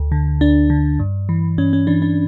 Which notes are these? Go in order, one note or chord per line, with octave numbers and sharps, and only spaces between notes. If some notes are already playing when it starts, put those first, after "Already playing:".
Already playing: D2
D3
D2 D4
D3
G2
E3
G2 C#4
C#4
E3 D4
D4